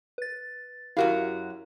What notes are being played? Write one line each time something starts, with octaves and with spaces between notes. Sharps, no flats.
B4 A6
F#2 E4 F#4 G4 A#4 F5